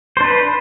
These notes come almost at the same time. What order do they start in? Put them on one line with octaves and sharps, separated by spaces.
C5 D4 B4